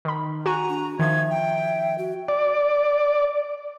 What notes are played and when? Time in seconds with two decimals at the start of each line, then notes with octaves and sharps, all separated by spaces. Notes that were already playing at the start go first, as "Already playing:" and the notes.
0.05 D#3 B5
0.46 F#4 G#5 A#5 D#7
0.69 D4
0.99 D#3 F3 E5 G#6
1.30 G5
1.98 F#4
2.28 D5